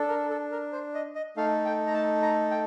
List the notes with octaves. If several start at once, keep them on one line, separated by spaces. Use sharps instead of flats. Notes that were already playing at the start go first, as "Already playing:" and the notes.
Already playing: D4 A4
A#4
A4
A#4
C5
D#5
D#5
A3 D#4 A4 F5
G5
A#5
A5
A#5
G5